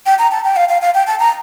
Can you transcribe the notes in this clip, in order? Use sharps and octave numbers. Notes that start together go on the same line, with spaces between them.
G5
A#5
A5
G5
F5
F5
F5
G5
A5
A#5